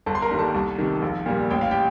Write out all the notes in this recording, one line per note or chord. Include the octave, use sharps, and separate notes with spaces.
G1 A4 A5
C6
A#4 A#5
G2 D#3 G3 A#3
A4 A5
C2
C3 D#3
A#1
A#2 G3 A#3
A1 G5
F5
G4 G5